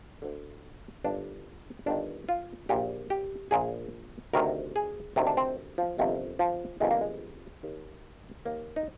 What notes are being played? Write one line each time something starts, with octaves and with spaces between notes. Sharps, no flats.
D2 D3
G1 G2 D#3 D4
G1 G2 D#3 D4
F4
A#1 A#2 G4
G4
A#1 A#2 G#4
D2 C3 D#3 A#4
G#4
D2 C3 D#3
D4
C4
F3
G1 F2 C3 D#3
F3
G1 F2 C3 D#3 G#3
A#3
G#3
D#2 D#3
D#2 D#3 A#3
D#4